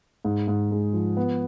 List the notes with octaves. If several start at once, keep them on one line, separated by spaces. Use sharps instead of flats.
G#2
G#2
G#3
F3
B3